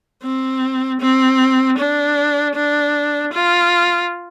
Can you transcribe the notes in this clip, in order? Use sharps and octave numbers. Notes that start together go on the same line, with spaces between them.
C4
C4
D4
D4
F4